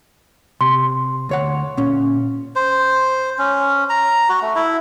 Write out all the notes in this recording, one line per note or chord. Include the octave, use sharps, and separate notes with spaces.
C3 C6
D2 C#5 F#5
A#2 C#4
C5
C#4
A#5
F#4
A3
E4